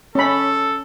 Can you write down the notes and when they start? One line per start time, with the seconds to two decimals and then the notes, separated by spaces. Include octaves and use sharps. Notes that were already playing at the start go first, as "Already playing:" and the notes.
0.15 C#4 A4 B5